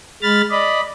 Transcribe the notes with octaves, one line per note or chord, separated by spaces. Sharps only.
G#3 B5 F6 A6
D5 D#5 B5